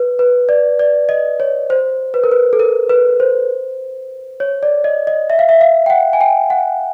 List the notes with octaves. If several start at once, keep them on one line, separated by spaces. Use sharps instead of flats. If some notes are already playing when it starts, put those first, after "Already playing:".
Already playing: B4
B4
D5
D5
D#5
C#5
C5
B4
A#4
B4
A4
A#4
B4
C5
C#5
D5
D#5
D#5
E5
F5
E5
F5
G5
F#5
G#5
G5
F#5